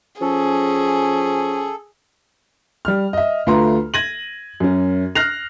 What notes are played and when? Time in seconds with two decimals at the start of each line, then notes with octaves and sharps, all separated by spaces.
0.21 F3 C#4 G#4 A4
2.85 G3 F6
3.13 D#5 E5
3.47 D2 A3 F4 B4 A#5 C6
3.94 G#6 A#6 D#7 F#7
4.60 F#2 C#4
5.15 F6 F#6 A#6 C7 F7